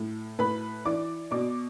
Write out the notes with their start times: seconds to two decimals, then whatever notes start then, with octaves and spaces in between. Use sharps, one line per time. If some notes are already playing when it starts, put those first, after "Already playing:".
Already playing: A2
0.39 A2 B4 B5
0.85 E3 D5 D6
1.31 B2 D5 D6